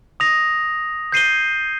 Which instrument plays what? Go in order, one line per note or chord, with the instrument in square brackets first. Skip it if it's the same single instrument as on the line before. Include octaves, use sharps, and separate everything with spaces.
[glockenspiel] D#6 A#6 F7
G6 C7 D#7 G7